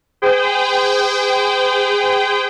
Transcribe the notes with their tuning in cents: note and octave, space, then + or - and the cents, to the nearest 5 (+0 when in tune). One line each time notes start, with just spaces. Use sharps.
G#4 -25 C5 -40 G5 -15